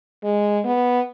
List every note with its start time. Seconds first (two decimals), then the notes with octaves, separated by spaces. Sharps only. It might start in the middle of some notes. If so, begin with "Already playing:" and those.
0.23 G#3
0.64 B3